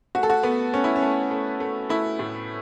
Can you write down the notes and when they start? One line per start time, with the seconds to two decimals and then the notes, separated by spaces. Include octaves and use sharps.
0.15 A3 F#4
0.23 A4
0.30 F#4
0.43 A3 B3
0.73 A3 C#4
0.84 E4
0.96 C#4
1.02 A3
1.31 A3
1.60 A3
1.89 A3 E4
2.19 A2